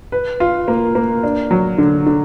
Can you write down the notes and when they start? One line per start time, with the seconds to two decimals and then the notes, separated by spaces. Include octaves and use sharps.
0.12 B4
0.40 F4
0.68 A#3
0.95 A#3
1.23 D4
1.51 F#3
1.78 D3
2.06 D3